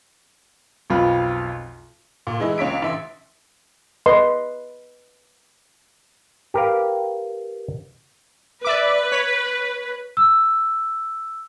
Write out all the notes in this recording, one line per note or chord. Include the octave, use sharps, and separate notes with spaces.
B1 F2 F4 B5
A#2
E3 G#3 D#4 E4
C#2 C#5 B6 D7
A1 E5 C6
B4 D#5 C6
G4 A#4 B4 F5
B4 D5 E5 D6
C#5 B6
E6